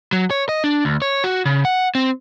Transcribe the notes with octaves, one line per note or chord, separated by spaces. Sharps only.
F#3
C#5
D#5
D4
D2
C#5
F#4
C#3
F#5
C4